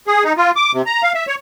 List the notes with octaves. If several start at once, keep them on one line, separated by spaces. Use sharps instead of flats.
G#4
D#4
F4
D6
C3
A#5
F5
E5
C#5